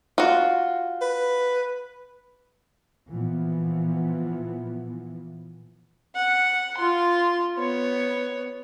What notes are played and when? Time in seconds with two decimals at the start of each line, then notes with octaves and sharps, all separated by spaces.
0.18 F4 F#4
1.02 B4
3.08 A#2 E3 F3 B3
6.15 F#5
6.77 F4 C6
7.58 B3 C#5